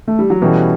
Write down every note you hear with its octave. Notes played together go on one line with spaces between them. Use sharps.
A3
G3
F#3
B2 E3 G3 C#4 F#4 A4